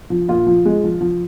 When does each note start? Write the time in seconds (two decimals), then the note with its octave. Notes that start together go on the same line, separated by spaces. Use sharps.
0.10 F3
0.29 A#2 F4
0.47 F3
0.65 G#3
0.84 F3
1.01 F3